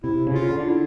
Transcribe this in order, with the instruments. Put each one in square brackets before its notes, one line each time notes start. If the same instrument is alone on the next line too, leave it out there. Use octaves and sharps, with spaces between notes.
[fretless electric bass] C3 [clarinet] E4
[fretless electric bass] C#3
[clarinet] F4
[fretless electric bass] D3
[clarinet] E4